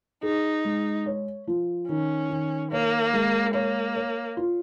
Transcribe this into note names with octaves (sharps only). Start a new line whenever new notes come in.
D#4 G#4
G#3
C#5
F3
D#3 C#4
D#3
A#3 C#5
G#3
A#3 C#5
C#5
F4